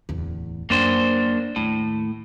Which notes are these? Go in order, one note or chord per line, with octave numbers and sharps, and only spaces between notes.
D1 E2
F#2 A#3 D4 C5
D#2 A2